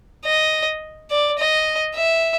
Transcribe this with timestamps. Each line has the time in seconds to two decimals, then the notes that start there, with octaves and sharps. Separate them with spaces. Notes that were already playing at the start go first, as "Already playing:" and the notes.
0.25 D#5
1.10 D5
1.39 D#5
1.95 E5